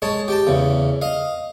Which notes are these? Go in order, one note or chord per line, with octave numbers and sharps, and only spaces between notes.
G#3 C#5 A5
G4 G5 A5
E2 C#3
D#5 F5